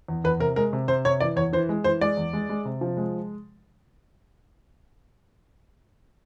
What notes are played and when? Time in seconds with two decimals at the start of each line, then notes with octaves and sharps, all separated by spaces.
0.08 E2
0.24 E2 B4
0.40 C3 A#4
0.56 G#3 A#4
0.73 C3
0.88 C3 C5
1.05 C3 C#5
1.20 E3 D5
1.36 E2 C#5
1.53 E3 C5
1.69 G#3
1.84 E3 C5
2.01 G#3 D5
2.17 E2
2.33 G#3
2.49 G#3
2.65 C3
2.81 F3
2.97 G#3